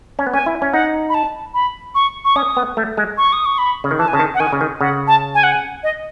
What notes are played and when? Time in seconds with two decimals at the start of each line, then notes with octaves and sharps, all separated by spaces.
0.19 C#4
0.27 B3
0.33 C#4 G#5
0.46 E4
0.62 C#4
0.72 D#4 F#5
1.09 B5
1.14 A5
1.54 B5
1.95 C#6
2.25 C#6
2.36 C#4 D#6
2.57 B3
2.77 A3
2.97 G#3
3.18 C#6
3.33 D#6
3.46 C#6
3.58 B5
3.84 C#3
3.91 D#3
3.99 E3 A5
4.08 G#5
4.13 C#3 A5
4.19 D#3
4.35 F#5
4.40 D#3 G#5
4.53 C#3
4.61 D#3
4.81 C#3 F#5
5.07 A5
5.35 G#5
5.43 F#5
5.52 G#5
5.83 D#5